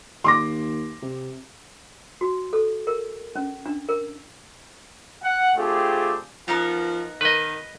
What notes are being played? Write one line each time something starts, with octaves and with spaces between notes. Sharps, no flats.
D#2 C6 D6 A#6
C3
F#4
A4
A#4
C#4
D4
A#4
F#5
A3 C4 D4 F4 G4 G#4
F3 B3 D#4 A#4
D#3 B4 D#5